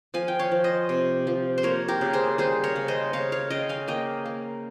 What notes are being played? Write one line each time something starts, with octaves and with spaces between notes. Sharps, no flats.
F3 F5 G#5
G5
C#5 F5
F3
C5 D#5
C3
F3
C5
A#3 A#4 C#5
G4 A#4
C#3
G#4 C5
G3 G#4 C5
A#4 C#5
C#3
C5 D#5
C#3 C#5 F5
C#5 F5
C#3 D#5 G5
F5 G#5
A#3 D#5 G5
A#3